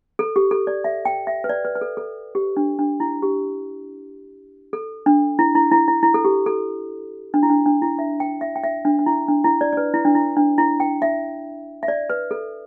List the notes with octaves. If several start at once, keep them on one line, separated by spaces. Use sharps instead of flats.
A4
G4
A4
D5
E5
G5
E5
B4
D5
B4
B4
A4
A4
G4
D4
D4
E4
G4
A4
D4
E4
E4
E4
E4
E4
A4
G4
A4
D4
E4
D4
D4
E4
E5
G5
E5
G5
E5
D4
D4
E4
D4
E4
D5
D5
B4
E4
D4
E4
D4
E4
G5
E5
E5
D5
B4
A4